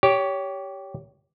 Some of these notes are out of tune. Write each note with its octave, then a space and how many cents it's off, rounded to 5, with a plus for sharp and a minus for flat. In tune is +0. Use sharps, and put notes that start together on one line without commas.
G4 -5 C#5 +20